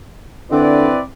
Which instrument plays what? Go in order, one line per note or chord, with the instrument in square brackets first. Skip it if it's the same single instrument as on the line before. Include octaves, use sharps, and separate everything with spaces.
[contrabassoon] D3 [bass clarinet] C4 [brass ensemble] E4 B4 D5